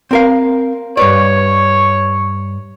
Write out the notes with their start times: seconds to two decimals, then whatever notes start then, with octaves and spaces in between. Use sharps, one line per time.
0.11 C4 A#4 F5
0.97 G2 B4 C#5 D5